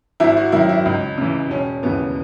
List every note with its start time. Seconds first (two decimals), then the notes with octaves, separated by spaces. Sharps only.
0.20 G#1 E4
0.37 F#4
0.52 F#2 D#3 E4
0.69 E4
0.85 C#2 D#4
1.18 C#3 E3
1.50 E1 C#4
1.83 D#2 C#3 E3 B3